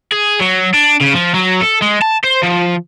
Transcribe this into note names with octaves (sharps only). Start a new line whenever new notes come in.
G#4
F#3
D4
C#3
F3
F#3
A4
G#3
A5
C5
F3